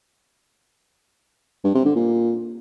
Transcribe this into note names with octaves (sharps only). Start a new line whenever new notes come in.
G2
C3
D3
A#2